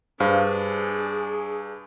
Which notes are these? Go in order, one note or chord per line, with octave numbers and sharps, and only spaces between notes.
G2 D4 G#4 C5 F5